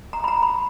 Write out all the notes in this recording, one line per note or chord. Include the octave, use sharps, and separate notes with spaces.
A#5
B5
A#5
B5